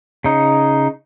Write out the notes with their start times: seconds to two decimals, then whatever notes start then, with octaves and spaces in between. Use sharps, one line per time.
0.24 C#3 D#4